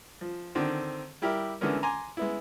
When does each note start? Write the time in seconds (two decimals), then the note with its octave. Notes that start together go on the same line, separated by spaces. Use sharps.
0.21 F3
0.55 D3 D#3 C4
1.22 G3 E4 G4 A#4
1.61 D3 E3 G#3 B3 C#4 A#4
1.83 G#5 A#5 C6 D6
2.17 G#3 B3 E4